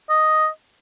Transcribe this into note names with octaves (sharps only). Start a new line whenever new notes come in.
D#5